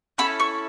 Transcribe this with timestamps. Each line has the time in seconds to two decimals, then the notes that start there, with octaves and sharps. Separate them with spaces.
0.18 C#4 E4 A4 B5
0.40 C#6